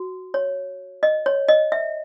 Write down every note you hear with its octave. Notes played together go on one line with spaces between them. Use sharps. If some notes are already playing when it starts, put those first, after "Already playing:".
Already playing: F#4
C#5
D#5
C#5
D#5
E5